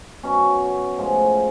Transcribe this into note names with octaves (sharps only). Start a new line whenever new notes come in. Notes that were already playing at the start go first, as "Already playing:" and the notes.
B2 F#3 C#4
A2 F3 G#3